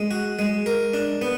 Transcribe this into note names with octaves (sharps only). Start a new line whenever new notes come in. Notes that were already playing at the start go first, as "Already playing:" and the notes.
Already playing: G#3
F#4
G#3
A#4
D4
B3